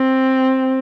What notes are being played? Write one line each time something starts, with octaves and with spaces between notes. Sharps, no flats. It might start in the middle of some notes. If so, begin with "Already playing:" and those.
Already playing: C4